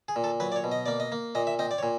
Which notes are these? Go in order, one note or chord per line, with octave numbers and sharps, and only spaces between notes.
G#4
A#2
A4
F#3 B4
D5
C#5
B2
D#5
A#3 D5
D#5
A#3
A#2 D#5
E5
C4 D#5
D5
C#5
A#2